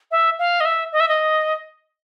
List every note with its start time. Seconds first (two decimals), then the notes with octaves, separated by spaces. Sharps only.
0.11 E5
0.39 F5
0.60 D#5
0.65 E5
0.92 D#5
1.00 E5
1.08 D#5